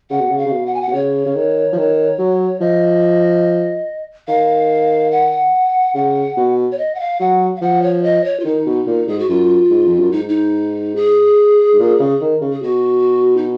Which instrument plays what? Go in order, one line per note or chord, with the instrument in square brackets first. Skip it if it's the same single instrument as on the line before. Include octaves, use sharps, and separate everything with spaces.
[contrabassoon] C#3 [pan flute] F#5
[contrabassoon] B2
C#3
[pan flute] F5
[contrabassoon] C#3
B2
[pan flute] F#5
G#5
F#5
[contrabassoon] B2
[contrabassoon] C#3 [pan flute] C#5
[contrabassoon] C#3
D#3
F3
D#3
F#3
[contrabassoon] F3 [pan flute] D#5
[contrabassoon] D#3 [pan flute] F5
[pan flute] F#5
[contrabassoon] C#3 [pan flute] F#5
[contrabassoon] B2
[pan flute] C#5
D#5
F#5
F5
[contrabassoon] F#3 [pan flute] F#5
[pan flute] F5
[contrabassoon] F3 [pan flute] F#5
[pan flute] C#5
D#5
C#5
F4
[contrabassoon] D#3 [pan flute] D#4
[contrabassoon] B2
A#2
[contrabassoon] G#2 [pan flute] G#4
[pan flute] F#4
[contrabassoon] F#2 [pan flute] F4
[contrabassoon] G#2
F2
F#2
[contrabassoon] G#2 [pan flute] D#4
[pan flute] D#4
G#4
[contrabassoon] G#2
A#2
C#3
D#3
C#3
[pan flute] G#4
[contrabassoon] B2 [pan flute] F#4
[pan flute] D#4